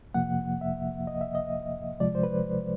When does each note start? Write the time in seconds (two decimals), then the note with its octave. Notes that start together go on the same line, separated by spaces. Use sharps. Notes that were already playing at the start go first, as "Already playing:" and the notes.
0.14 F2 C3 F3 A#3 F#5
0.61 E5
1.07 D#5
1.21 E5
1.35 D#5
2.00 D2 C3 F3 G#3 D5
2.15 C5
2.23 B4